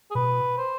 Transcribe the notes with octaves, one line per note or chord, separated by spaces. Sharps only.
G#4
B2 B4
C5